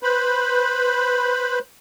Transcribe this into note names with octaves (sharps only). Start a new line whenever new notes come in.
B4 C5 B5